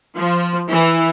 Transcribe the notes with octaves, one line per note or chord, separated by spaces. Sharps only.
F3
E3